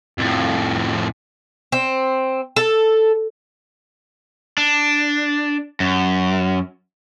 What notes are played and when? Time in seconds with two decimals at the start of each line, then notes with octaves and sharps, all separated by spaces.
0.18 F2 A2
1.72 C4
2.56 A4
4.57 D4
5.80 F#2